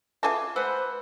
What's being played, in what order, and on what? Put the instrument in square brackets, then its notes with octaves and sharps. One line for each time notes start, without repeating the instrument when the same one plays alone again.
[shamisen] F4 G#4 A4 [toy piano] B4 E5 D6
[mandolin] B4 C5 F#5 [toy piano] E6